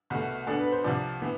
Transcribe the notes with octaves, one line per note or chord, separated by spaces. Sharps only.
C2 B2 A3
B2 B3 D4 A4
B4
C5
C2 C3 F3 D5
E3 B3